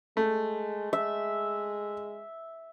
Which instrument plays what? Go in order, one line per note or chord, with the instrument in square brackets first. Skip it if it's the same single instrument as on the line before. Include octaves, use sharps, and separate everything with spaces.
[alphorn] G#3 [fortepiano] A3
[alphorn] G#3 [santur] E5